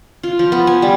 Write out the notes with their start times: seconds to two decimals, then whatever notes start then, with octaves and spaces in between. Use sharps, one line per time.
0.23 F4
0.39 F3
0.52 B3
0.67 G#5
0.82 G3